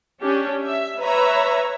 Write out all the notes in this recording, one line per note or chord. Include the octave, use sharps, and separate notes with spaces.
C#4 D4 G4
E5
B4 C#5 E5 A#5